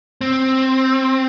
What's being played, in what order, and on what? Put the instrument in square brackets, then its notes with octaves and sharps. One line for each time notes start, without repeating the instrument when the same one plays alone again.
[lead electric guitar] C4